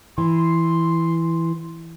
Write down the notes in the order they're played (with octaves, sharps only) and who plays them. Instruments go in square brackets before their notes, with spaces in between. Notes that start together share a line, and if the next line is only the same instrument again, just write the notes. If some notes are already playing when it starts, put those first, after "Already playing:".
[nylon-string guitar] E3 [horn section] C6